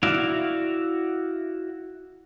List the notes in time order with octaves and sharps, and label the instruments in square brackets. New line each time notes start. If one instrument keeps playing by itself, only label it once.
[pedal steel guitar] E4 F#4 D5 E5 F5